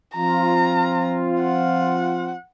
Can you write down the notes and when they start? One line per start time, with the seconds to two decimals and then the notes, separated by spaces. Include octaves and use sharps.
0.15 F3 C4 F4 A#5
1.40 F#5